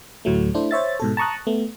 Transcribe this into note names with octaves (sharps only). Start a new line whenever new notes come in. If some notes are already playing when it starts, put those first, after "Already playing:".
D2 A2 F#3 A3
A3 D4 E4 C5
C5 C#5 E5 A6
G#2 B2 A4
A5 A#5 C#6 D#6 F#6
A3 B3